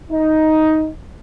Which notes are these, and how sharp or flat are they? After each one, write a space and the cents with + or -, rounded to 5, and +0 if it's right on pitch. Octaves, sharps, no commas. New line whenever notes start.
D#4 +10